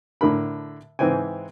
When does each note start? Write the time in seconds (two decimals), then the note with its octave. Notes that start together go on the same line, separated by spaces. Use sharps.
0.21 A2 D3 A#4 B5
0.99 G#2 E3 C4 G5 G#5